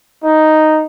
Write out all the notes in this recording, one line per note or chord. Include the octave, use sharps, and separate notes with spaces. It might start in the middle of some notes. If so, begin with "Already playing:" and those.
D#4